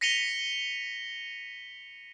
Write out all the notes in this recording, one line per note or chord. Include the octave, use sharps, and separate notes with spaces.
A#6 B6 C#7 D#7 F7 G7